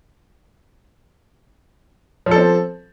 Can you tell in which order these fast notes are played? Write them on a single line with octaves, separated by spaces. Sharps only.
F3 A4 C4